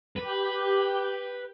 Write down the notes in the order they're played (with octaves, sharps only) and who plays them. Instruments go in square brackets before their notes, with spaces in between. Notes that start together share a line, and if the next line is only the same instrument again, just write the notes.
[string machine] G4 G6 [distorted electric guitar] B4